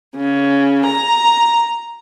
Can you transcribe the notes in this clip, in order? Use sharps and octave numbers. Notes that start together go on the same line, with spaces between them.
C#3
A#5